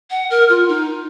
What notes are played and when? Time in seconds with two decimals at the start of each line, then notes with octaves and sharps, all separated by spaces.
0.10 F#5
0.30 A#4
0.49 F4
0.69 D#4